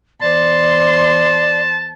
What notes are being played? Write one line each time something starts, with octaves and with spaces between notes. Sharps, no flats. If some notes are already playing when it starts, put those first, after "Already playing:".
E2 C5 D5 A5 C6